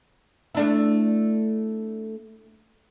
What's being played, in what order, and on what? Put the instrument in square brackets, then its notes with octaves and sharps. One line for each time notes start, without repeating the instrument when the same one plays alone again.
[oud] A3 D4 E4